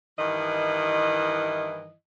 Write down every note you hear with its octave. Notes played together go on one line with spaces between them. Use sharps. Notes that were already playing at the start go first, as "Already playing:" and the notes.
G2 D#3 E3 E4 D#5